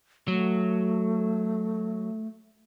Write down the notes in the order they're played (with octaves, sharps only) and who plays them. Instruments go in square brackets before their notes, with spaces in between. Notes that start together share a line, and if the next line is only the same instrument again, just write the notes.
[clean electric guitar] F#3 [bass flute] A3